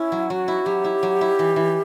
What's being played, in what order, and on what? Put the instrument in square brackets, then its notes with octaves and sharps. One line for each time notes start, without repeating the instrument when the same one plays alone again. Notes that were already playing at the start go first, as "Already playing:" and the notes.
Already playing: [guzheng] C#4 [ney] E4
[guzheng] F#3
[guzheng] F#3 [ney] F#4
[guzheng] E4
[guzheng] F#3 [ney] G4
[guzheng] E4
F#3
E4
E3
E3